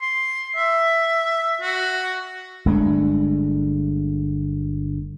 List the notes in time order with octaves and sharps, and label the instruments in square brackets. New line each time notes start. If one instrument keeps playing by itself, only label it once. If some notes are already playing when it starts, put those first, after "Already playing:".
[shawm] C6
E5
F#4
[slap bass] G1 G#3 A3 D4